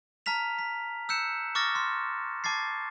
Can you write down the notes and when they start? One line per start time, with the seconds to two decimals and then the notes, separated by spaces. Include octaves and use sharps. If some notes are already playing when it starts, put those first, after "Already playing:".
0.26 A5 A#5 F6 B6 F7
0.59 B6
1.09 E6 F#6 G6 C#7 E7
1.55 C#6 D6 E6 F6 A6 A#6
1.75 C6 F6
2.44 A5 D6 G#6 A6 C7